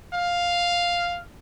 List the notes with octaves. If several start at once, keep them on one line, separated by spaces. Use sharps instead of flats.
F5